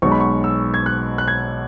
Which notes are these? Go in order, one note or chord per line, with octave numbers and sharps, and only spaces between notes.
B1 B2 G#3 C#6
B5
C#6
E6
G#6
F#6
F#6
G#6